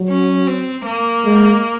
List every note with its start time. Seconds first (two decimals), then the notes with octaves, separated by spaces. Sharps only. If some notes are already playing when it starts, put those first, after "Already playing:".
Already playing: F#3
0.09 C#4
0.47 C4
0.86 A#3
1.25 G#3